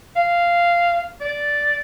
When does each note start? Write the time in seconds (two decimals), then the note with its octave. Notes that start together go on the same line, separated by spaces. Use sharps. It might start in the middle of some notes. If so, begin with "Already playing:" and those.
0.16 F5
1.21 D5